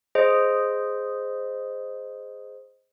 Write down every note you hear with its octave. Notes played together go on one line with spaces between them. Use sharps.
G#4 C5 D#5